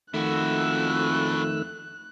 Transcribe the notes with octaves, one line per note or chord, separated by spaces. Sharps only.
F2 D#3 A3 E4 F#4 E6 F#6